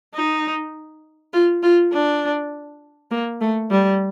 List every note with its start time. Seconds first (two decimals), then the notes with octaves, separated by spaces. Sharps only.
0.15 D#4
1.33 F4
1.63 F4
1.93 D4
3.11 A#3
3.41 A3
3.71 G3